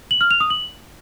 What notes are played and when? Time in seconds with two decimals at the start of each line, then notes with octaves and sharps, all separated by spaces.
0.11 F#7
0.21 F6
0.31 F7
0.40 D#6
0.50 F#7